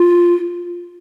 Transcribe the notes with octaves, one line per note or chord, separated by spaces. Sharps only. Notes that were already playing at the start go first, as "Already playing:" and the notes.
Already playing: F4